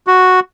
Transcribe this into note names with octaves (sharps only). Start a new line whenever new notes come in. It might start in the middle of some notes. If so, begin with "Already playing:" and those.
F#4